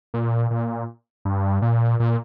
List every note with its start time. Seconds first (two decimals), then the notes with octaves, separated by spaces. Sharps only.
0.14 A#2
0.51 A#2
1.25 G2
1.62 A#2
2.00 A#2